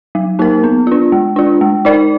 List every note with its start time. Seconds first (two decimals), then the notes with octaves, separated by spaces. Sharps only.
0.15 F#3
0.39 A#3 D#4 A#4
0.64 B3
0.87 D4 F4
1.12 G#3
1.36 D4 F4
1.61 G#3
1.85 D#4 A#4 D5